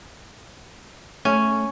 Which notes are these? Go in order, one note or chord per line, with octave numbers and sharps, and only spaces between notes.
A3 C#4